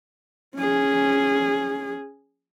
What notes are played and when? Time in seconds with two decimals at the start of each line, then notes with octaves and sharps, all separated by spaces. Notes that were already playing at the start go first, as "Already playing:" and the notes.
0.56 C#4 G#4